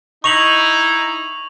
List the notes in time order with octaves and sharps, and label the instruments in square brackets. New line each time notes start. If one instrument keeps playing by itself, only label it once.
[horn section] D#4 [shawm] E4 [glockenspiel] C#6 F7 F#7